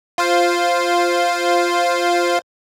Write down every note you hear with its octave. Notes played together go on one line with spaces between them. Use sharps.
F4 C5 F5